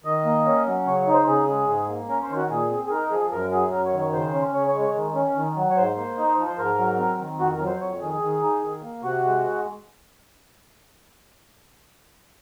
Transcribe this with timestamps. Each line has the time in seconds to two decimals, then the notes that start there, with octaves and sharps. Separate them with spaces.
0.04 D#3 D#5
0.25 A#3
0.45 C#4
0.67 F#3
0.86 C#3 C#5
1.00 C#5
1.07 D#4
1.14 C5
1.28 C#3 G#4
1.48 G#3
1.68 G#2
1.88 A#3
2.09 C#4 A#4
2.22 C5
2.29 D#3
2.36 F#4
2.49 A#2 G#4
2.70 C4
2.86 G#4
2.90 D#4 A#4
3.11 F3 G#4
3.31 F#2 A#4
3.51 F#3 G#4
3.72 F#2 A#4
3.86 C#5
3.92 D#3
3.99 C#5
4.13 C#3 C5
4.33 C#4
4.54 C#3 C#5
4.68 C#5
4.74 G#3
4.81 C#5
4.95 D#3
5.15 C#4
5.35 D#3
5.56 F#3
5.70 C#5
5.76 G#2 C5
5.96 A#3
6.17 D#4
6.37 F3
6.47 C5
6.58 G#2 A#4
6.78 F#3
6.98 C4
7.19 D#3
7.40 F2 F#4
7.53 A#4
7.60 F#3
7.66 C5
7.80 F2 C#5
8.01 D#3 G#4
8.21 D#3
8.42 D#4
8.62 D#3
8.82 A#3
9.03 C3 F#4
9.24 G#3